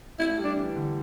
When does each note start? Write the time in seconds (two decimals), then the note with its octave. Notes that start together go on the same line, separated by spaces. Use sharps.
0.19 A3 E4
0.38 G3
0.44 D4
0.56 E3
0.76 D3